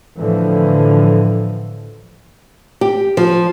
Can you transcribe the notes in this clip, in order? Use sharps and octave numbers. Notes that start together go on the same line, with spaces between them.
A2 D3 E3 F3
G4
F3